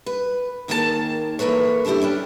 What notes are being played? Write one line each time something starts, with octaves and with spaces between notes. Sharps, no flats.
B4
D#2 D#3 A#3 G#4 A4 A5
E3 A3 A#3 B4 C#5
C#3 A3 D4 E4 G4
G3 C#4 D4